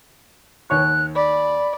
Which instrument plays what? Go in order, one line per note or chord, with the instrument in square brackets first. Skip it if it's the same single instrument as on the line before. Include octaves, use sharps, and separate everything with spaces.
[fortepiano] D#2 C#5 C#6 [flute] F#6
[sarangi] D5 [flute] B5